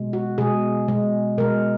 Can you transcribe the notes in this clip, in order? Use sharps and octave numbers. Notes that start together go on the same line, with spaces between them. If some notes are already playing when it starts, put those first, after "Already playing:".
Already playing: B2 G#3
F#4
B2 G#3 G#4
B2 G#3
B2 G#3 A#4